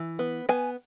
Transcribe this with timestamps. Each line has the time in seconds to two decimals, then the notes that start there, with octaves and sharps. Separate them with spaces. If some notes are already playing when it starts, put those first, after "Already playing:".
Already playing: E3
0.19 B3
0.49 B3 G#5